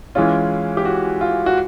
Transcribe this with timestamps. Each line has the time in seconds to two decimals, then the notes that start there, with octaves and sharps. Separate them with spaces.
0.15 E3 G#3 C#4 F4
0.77 G4
0.85 F#4
1.21 F4
1.46 F#4